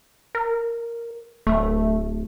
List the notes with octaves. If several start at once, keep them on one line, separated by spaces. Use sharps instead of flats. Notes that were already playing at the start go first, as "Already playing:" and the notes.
A#4
D1 A3